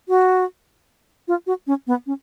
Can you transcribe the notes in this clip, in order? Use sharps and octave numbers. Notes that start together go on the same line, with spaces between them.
F#4
F4
F#4
C#4
B3
C#4